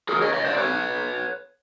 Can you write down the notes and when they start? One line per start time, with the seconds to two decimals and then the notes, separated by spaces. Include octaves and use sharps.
0.09 G#4 A#4
0.22 C#5 D#5
0.33 C#5 D#5
0.45 C5 D5
0.57 B4 C#5